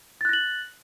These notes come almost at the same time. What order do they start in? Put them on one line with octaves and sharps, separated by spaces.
A6 F#6 A#6 F#7